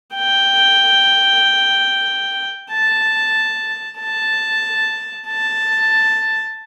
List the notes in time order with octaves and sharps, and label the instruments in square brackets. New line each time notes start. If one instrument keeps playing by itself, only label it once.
[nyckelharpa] G5
A5
A5
A5